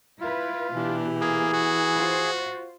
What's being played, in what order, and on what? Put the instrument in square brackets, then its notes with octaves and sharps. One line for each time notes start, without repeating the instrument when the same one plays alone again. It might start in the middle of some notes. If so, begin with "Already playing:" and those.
[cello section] E4 B4 [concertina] F4
[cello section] B2 G4 [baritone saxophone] E3 [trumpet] D4
[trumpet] A#3 [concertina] G#4
[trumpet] F#4
[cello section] F4 C5